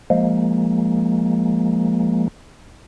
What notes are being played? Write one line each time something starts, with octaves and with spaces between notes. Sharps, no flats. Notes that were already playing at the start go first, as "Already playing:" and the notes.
F3 G#3 A#3